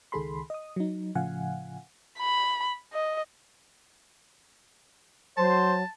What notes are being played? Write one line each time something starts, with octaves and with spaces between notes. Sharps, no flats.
C#2 D#3 G#4 A4 B5 C6
D#5 D#6
F#3 D#4
A2 C#3 F3 F5 F#5 G#5
B5
D#5
F#3 C5 A5